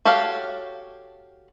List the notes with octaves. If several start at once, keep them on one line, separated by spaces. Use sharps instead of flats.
F#4 G4 A4 C#5 F5